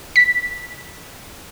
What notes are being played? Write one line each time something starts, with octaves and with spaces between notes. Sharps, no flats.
B6